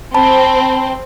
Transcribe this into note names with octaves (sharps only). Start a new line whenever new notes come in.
C4 A5 B5